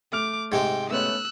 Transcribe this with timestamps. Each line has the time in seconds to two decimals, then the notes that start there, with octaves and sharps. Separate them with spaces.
0.12 A3 D6 F6 F7
0.52 G#2 C3 G#3 G5
0.90 A3 B3 C#4 E6 F#6